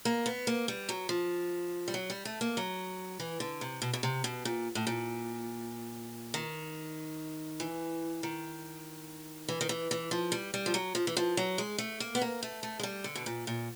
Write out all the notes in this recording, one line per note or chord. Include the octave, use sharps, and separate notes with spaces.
A#3
B3
A#3
G3
F#3
F3
G3
F#3
G3
A3
A#3
F#3
E3
D3
C3
B2
B2
C3
B2
A#2
A2
A#2
D#3
E3
D#3
E3
D#3
E3
E3
F3
G3
G3
F3
F#3
F3
E3
F3
F#3
G#3
A3
A#3
B3
A#3
A3
A3
G#3
G3
D3
B2
A#2
A#2